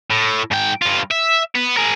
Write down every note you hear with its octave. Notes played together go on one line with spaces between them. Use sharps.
A2
G#2 G5
G2 F4
E5
B3
G#4 A#4